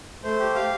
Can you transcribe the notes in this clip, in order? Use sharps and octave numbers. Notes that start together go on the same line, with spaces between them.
A3 C5
G4
G4 F5